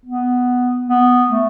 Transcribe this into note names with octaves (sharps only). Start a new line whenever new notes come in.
B3
B3
A3